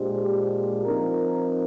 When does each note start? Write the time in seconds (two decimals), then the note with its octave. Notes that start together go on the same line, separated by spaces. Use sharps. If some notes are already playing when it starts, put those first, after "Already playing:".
Already playing: A#2 G#3 D4 G4 C5
0.85 F3 C4 D#4 A#4